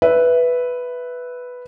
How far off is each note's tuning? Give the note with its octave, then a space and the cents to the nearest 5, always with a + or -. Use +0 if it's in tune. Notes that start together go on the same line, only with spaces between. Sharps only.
B4 +0 E5 +0